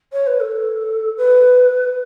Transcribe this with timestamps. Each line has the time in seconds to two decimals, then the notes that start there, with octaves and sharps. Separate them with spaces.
0.12 C#5
0.27 B4
0.40 A4
1.17 B4